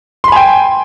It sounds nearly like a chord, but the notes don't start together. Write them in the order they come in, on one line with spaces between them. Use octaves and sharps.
C6 B5 G#5 G5